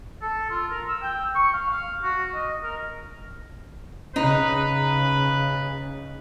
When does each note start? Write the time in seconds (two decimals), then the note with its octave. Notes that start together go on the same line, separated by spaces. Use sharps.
0.22 A4
0.50 F4
0.71 A#4
0.88 E6
1.02 G5
1.35 C#6
1.53 F5
1.70 F5
2.03 F#4
2.34 D#5
2.64 A#4
4.16 C#3 C#4 D#4 B4